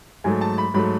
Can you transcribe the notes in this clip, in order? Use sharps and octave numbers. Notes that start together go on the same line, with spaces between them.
G#2 F#3 A3 G#5
A5
B5
G#2 F#3 A3 B5